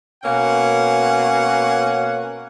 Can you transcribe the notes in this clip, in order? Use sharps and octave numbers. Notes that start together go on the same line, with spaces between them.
B2 A#3 C#4 F#5